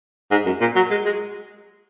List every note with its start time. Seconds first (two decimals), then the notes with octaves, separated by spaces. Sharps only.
0.31 G#2
0.46 F#2
0.61 A#2
0.76 F#3
0.91 G#3
1.05 G#3